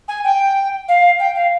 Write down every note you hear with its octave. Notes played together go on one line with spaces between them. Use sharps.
G#5
G5
F5
G5
F5